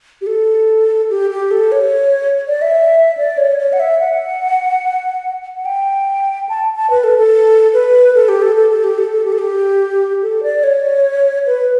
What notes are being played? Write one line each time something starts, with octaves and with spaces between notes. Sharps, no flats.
G4
A4
G4
G4
A4
C#5
D5
E5
D5
C#5
C#5
F#5
E5
F#5
F#5
G5
A5
A5
B4
A4
A4
B4
A4
G4
A4
A4
A4
G4
A4
A4
G4
A4
G4
A4
D5
C#5
B4